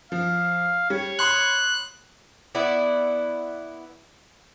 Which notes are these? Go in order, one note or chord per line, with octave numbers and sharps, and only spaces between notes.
F3 F5
G3 C#5
B5 C6 D#6 F#6
B3 E4 D5